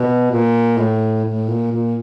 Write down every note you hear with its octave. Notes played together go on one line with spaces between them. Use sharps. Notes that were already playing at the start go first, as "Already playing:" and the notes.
Already playing: B2
A#2
A2
A2
A#2
A#2